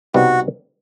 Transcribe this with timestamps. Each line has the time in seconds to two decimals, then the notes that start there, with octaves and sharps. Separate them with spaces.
0.14 C2 B2 G3 B3 D#4 F#4